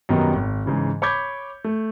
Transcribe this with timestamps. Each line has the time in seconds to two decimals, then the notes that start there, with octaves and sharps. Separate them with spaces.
0.09 F#2 B2 D#3 G3 B3 D#4
0.34 G#1
0.66 G#2 C#3 E3
1.02 C#5 B5 D6 G6 G#6
1.64 A3